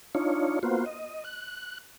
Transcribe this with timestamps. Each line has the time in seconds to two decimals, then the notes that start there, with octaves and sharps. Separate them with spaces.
0.15 D4 D#4 F4 C#5
0.63 A#3 B3 F4 F#4 C5
0.86 D#5
1.25 F#6